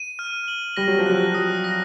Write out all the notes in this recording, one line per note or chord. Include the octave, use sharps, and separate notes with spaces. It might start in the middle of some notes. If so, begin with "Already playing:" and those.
Already playing: D#7
F6
F#7
G3 A#6
F#3
F3
F#3 F#6
D#6
A#6